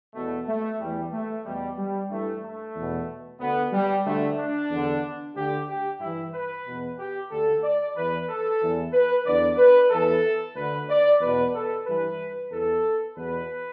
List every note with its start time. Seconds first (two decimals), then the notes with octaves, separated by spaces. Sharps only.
0.15 E2 B2 A3
0.48 A3
0.80 E2 E3 G3
1.13 A3
1.45 E2 B2 G3
1.78 G3
2.10 G2 E3 A3
2.43 A3
2.76 E2 B2
3.40 D2 D3 B3
3.72 G3
4.06 D2 D3 A3
4.38 D4
4.70 E2 D3
5.36 D2 D3 G4
5.69 G4
6.00 G2 E3 E4
6.33 B4
6.65 E2 B2
6.99 G4
7.31 D2 D3 A4
7.63 D5
7.95 E2 E3 B4
8.29 A4
8.61 E2 E3
8.93 B4
9.26 E2 D3 D5
9.58 B4
9.90 E2 E3 A4
10.56 D2 D3 B4
10.89 D5
11.21 E2 B2 B4
11.54 A4
11.86 G2 E3 B4
12.52 E2 E3 A4
13.17 E2 B2 B4